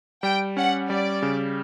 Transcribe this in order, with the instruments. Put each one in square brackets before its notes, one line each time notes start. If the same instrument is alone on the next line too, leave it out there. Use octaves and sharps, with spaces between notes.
[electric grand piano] G3 [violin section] G5
[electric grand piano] C#4 [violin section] F#5
[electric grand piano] G3 [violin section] D5
[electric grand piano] C#3